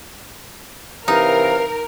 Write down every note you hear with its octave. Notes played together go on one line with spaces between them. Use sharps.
C3 E3 D#4 A#4 F5